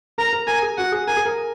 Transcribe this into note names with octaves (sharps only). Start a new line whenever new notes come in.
A#4 A#5
A#4
A#4 G#5
G#4
F#4 F#5
G#4
A#4 G#5
G#4
A#4